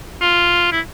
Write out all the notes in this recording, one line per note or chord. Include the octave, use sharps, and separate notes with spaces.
F4
E4